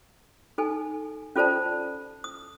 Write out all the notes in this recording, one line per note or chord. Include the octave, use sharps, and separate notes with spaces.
D#4 A4 G#5
C#4 F4 A4 C5 D5 A5
D#6